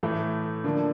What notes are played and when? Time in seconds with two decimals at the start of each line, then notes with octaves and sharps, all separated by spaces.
0.03 A2 E3 A3
0.64 D3 F3 A#3